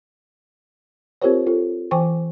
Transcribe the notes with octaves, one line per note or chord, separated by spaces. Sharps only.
C4 F4 G4 A#4 C5 C#5
F4 A4
E3 C5 G5 G#5 C#6 D6